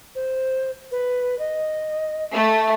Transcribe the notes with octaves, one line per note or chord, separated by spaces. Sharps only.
C5
B4
D#5
A3